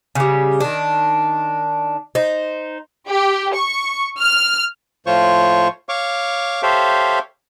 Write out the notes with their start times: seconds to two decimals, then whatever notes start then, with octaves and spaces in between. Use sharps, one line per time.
0.15 C#3 G3
0.60 D#3 D4
2.15 D#4 C5
3.09 G4
3.55 C#6
4.20 F6
5.06 A2 F3 F4 C5 C#5 C#6
5.89 C#5 F5 C#6 D6
6.63 G4 A4 C5 C#5 E5 F5